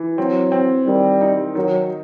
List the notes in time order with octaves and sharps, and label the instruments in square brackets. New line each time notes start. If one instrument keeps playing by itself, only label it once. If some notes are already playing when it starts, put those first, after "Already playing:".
Already playing: [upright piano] E3
[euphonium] F#3 [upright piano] C4
[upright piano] C4
[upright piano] D#3 [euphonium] G3
[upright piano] D#4
[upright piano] D#3 [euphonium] F#3